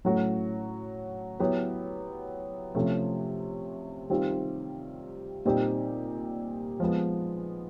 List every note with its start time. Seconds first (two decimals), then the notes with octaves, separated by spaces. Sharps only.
0.04 A2 F#3 A3 C#4 F#4
1.40 F#3 B3 E4 G4
2.75 C3 F3 A3 C#4
4.10 D#3 G3 C4 F4
5.45 A#2 G3 C4 D#4 G4
6.80 F3 G#3 B3